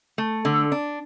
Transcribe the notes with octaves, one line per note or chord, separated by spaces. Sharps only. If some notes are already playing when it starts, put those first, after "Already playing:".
A3
D3
D4